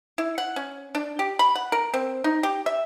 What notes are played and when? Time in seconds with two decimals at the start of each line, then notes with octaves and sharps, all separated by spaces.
0.18 E4
0.38 F#5
0.56 C#4
0.95 D4
1.19 G4
1.39 B5
1.55 F#5
1.72 A#4
1.94 C4
2.24 D#4
2.43 G4
2.66 E5